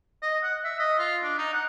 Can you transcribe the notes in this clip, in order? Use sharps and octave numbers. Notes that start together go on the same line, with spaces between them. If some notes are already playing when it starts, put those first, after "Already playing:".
D#5
F#5
E5
D#5
F4
D4
D#4
F#5